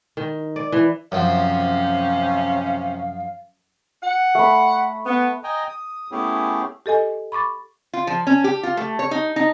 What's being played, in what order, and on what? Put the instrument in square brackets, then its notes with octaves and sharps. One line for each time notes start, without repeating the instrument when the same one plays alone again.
[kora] D#3
D5
E3
[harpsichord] F#2 F3 [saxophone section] C3 C#4 [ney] F5
[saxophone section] F#5
[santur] A3 B5
[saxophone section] B3
[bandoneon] D#5 G5 G#5 A#5
D#6
A3 B3 C#4 E4 G4 G#4
[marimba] G4 A4 D#5 G#5
B5 C#6 D6 A6
[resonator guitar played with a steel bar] F4
F3
C#4
G4
F4
A3
C#5
D#4
D#4